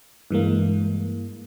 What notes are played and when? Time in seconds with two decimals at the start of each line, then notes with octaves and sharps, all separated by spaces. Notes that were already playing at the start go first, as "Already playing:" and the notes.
0.31 G2 E3 G#3 A#3